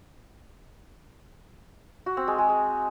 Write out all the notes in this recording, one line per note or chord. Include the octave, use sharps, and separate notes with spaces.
F#4
C4
G#3
G#3
G#3